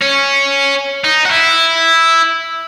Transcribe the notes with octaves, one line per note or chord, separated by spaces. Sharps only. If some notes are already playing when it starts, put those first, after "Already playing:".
C#4
D#4
F#4
E4